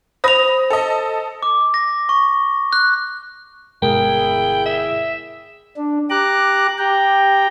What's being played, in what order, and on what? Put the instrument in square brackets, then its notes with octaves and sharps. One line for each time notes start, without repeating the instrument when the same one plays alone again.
[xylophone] C5 F7 [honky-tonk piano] B5 D#6 A#6
[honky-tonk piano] A4 D#5
[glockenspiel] D6
A#6
C#6
F#6
[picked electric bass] G1 B2 G#3 [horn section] E4 G#4 [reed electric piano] A#4 [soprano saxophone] G5
[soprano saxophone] E5
[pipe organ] D4
G4 A#5 D6 F#6
G4 G5 A#5